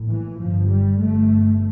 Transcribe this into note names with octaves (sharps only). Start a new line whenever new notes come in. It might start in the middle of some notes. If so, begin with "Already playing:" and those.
Already playing: A#1 A2
E3
G1 G2 F3
G3
G1 G2 A3